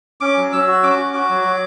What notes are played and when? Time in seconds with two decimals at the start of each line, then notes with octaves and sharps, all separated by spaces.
0.21 C#4 D6
0.37 F#3
0.52 F#3 E6
0.68 F#4
0.83 C#4 D6
0.98 F#4
1.13 F#4 D6
1.29 F#3
1.44 F#3